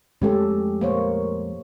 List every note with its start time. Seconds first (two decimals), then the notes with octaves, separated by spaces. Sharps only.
0.22 F2 G#3 A3 C#4 G4 A4
0.81 A#3 C5 C#5